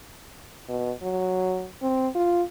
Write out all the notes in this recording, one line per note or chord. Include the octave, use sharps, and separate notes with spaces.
B2
F#3
C4
F4